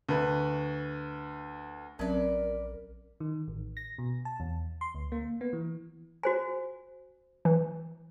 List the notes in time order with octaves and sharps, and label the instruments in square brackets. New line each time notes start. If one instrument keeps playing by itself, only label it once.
[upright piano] D2 B4
[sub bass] A#1 [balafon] F#3 C4 C#4 [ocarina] A#4 [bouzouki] B4 D5
[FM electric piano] D#3
A1
A#6
B2
A5
E2
C6
D2
A#3
B3
E3
[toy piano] F#4 C5 G#5
[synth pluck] E3